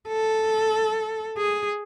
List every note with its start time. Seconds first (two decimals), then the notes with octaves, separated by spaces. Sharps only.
0.09 A4
1.37 G#4